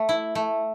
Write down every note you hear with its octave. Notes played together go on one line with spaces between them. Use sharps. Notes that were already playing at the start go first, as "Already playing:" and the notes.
Already playing: A3
E4
A3